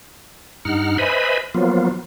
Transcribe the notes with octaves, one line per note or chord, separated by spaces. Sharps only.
G2 D#4 F#5 F6
B4 C5 D#5 E5 G#5 B5
F3 F#3 A#3 B3 F4